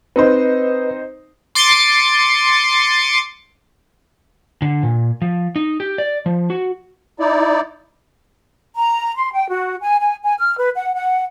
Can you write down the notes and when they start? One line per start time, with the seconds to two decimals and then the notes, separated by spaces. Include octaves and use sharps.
0.16 C4 D#4 B4 C5 D#5
1.55 C6 D6 A6 C7 C#7 D#7
4.62 D3
4.83 A#2
5.22 F3
5.56 D#4
5.80 G4
5.98 D5
6.26 F3
6.50 F#4
7.20 D#4 E4 D5
8.76 A#5
9.16 C6
9.33 G5
9.48 F#4
9.81 G#5
10.00 G#5
10.24 G#5
10.39 F6
10.58 B4
10.76 F#5
10.95 F#5